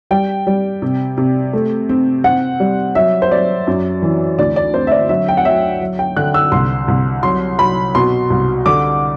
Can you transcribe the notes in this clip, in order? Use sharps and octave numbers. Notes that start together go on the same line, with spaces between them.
G3 G5
G3
C3
C3
A3
C4
C4 F#5
G3
F#3 E5
C5
F#3 D5
F#2
E3
D2 D5
D5
C4 C5
E5
D5
F#3 E5
G5
F#5
F#3 E5
F#3
G5
D3 F#6
E6
C2 C6
C2
F#3 C6
F#3 B5
B2 C6
C2
D3 D6